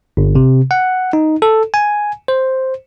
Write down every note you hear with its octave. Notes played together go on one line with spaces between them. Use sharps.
G1
C3
F#5
D#4
A4
G#5
C5